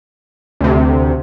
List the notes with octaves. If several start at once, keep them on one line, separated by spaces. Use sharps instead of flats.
D2 C3